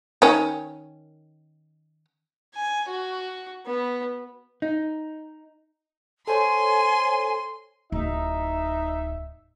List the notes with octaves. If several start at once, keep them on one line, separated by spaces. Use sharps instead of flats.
D#3 C#4
G#5
F#4
B3
D#4
A4 C5 C#5 G#5 C6
D1 D#4 E5